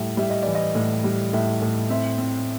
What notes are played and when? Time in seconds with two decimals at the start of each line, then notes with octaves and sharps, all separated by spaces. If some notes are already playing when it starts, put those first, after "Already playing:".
Already playing: A2 G3 E5
0.17 G3 E5
0.30 D#5
0.43 E3 D5
0.55 D#5
0.75 A2
1.04 G3
1.33 A2 E5
1.62 A2
1.90 C4 E5
2.18 C4